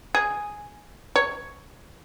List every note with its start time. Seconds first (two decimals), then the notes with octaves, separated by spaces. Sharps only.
0.15 G#4
1.16 C#5